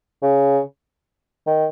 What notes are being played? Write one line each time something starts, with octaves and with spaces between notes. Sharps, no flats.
C#3
D#3